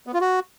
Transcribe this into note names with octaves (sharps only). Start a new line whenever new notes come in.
B3
F4
F#4